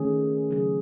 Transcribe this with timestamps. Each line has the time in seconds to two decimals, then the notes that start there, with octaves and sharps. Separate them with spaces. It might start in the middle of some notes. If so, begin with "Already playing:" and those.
Already playing: D#3 A3 C#4 G#4
0.50 C#3 F#3 C#4 G#4